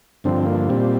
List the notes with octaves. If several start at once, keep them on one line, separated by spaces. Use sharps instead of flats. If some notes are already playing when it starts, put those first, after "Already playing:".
G2 D3 F3 C4
A#3
A#2 G3 C4